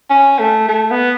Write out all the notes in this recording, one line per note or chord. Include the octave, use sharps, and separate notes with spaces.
C#4
A3
A3
B3